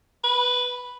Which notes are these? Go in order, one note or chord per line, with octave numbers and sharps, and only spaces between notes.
B4